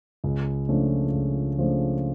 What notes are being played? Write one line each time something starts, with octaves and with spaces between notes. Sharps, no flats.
C#2
C#3 F3 A3 D4
C#2
C#3 F3 A3 D4